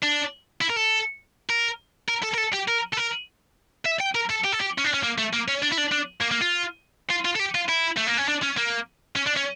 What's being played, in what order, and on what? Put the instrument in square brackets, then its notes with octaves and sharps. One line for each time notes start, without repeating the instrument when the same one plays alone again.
[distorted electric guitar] D4
E4
A#4
A4
A#4
A#4
A4
A#4
A4
G4
A#4
A4
A#4
E5
G5
A#4
A4
G4
A4
G4
C#4
D4
C#4
A#3
A3
A#3
C#4
D4
E4
D4
D4
A#3
A#3
F4
F4
F4
A4
G4
F4
E4
A3
A#3
C#4
D4
C#4
A#3
C#4
D4
C#4